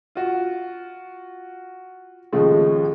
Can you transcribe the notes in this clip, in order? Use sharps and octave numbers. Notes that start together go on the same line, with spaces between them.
F4 F#4
D#2 A2 C#3 F3 G#3 A3